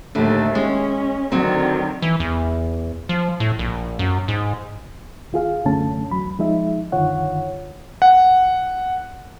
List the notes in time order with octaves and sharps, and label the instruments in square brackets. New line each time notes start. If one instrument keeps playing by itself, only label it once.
[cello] D#2 A3 [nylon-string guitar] A2 D3
[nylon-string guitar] G#3 [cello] C#4
[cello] D3 D#3 [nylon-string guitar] F#3 C4
[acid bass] E3
E2
F3
A2
A#1
F#2
G#2
[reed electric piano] D#2 F4 G#4 F5
C2 F#2 D3 A3 C#4 A5
E2 F#3 B5
F3 G#3 D#4 E5
F#2 D3 D#3 F4 C#5 F#5
[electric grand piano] F#5